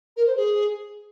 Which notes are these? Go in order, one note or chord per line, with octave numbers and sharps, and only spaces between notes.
A#4
C5
G#4